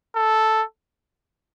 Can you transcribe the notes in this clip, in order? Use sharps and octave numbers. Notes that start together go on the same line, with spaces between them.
A4